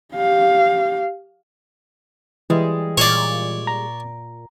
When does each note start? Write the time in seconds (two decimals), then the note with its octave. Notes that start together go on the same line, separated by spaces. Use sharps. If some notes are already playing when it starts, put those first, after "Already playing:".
0.14 G4 F5
2.50 E3 G3 G#3
2.98 A#2 C#5 D5
3.67 A#5